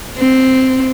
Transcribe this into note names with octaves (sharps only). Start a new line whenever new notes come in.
C4